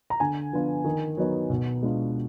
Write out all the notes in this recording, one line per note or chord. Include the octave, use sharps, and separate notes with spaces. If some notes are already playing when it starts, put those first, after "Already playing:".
A#5
D3 G#5
F3 B3 D4 F4
D#3
F#3 B3 D#4
B2
G#3 D4 F4